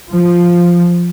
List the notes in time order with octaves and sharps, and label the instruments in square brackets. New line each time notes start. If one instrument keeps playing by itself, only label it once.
[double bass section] F3